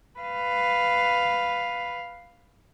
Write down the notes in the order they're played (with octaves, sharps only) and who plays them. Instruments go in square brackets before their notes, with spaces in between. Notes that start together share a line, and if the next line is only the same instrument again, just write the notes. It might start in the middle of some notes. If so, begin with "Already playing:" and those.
[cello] B4 F5